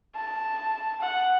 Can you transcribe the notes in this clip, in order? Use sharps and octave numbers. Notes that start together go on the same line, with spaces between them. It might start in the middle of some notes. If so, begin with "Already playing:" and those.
A5
F#5